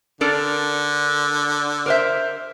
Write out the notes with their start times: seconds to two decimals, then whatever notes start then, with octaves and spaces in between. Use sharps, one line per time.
0.21 D3 D4 A4 A#4
1.86 A#4 C5 E5